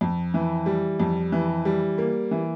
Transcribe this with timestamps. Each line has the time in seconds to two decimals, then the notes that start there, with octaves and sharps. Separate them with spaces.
0.01 F2
0.34 E3
0.66 G3
1.00 F2
1.32 E3
1.65 G3
1.98 A#3
2.31 E3